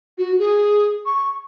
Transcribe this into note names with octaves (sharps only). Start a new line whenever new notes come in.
F#4
G#4
C#6